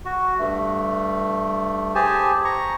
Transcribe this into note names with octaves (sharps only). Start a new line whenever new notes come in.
F#4
G2 A3
G4 G#4 C5 G#5 A5
A#5 C#6